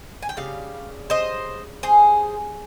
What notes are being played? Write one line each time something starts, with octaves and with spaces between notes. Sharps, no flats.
G#5
G5
C#3 G3 F5
C5 D#5
G#4 C5